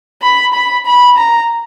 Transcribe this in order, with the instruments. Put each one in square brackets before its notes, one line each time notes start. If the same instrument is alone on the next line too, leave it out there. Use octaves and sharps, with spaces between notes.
[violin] B5
B5
B5
A#5